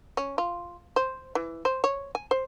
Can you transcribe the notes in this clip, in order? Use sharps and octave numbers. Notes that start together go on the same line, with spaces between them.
C#4
F4
C5
E3
C5
C#5
G#5
C5